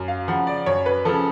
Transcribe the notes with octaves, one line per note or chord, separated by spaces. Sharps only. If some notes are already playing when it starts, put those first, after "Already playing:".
Already playing: F#2
F5
C#3 F3 F#5
D5
F#2 C#5
B4
C#3 F3 A4